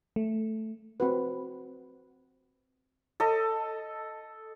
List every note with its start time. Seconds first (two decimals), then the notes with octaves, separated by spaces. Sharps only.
0.16 A3
1.00 C4 F#4 B4
3.20 A4 D#5